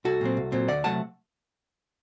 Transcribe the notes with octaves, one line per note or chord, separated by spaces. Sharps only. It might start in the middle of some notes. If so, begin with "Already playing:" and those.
C2 F#4 A4
A#2 F#3 C4
C2
A#2 F#3 C4
D2 D5 F#5
C3 F#3 A3 F#5 A5